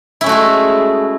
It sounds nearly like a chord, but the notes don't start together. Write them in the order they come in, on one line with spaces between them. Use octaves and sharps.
E4 C#4 A3 F#4 G#3